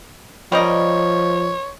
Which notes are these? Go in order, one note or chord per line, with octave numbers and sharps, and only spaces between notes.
F3 G3 A#4 C#5 D#5